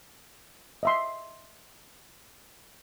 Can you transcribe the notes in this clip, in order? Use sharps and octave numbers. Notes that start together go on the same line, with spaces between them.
D#5 E5 C6